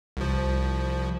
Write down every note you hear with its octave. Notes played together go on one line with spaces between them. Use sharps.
C2 F3